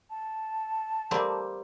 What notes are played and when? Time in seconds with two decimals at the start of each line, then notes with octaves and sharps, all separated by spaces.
0.10 A5
1.11 G3 A#3 C4